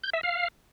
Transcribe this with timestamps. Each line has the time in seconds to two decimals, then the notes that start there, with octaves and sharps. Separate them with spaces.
0.04 G6
0.13 E5
0.23 F5